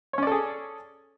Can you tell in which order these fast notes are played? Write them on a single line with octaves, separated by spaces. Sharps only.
C#5 C#4 D5 A4 G#4